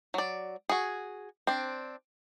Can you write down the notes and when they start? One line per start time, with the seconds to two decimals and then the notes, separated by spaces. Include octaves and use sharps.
0.14 F#3 D5
0.69 F#4 G#4
1.47 C4 D4